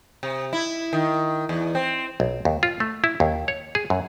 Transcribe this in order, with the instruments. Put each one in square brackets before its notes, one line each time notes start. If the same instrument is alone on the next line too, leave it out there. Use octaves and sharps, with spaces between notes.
[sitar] C3
E4
D#3
E2
C4
[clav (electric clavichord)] B1
D#2
F4
A3
E4
D#2
C#5
G#4
F#2